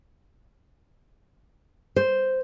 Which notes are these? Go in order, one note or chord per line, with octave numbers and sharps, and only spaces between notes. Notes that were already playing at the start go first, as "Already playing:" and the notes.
C5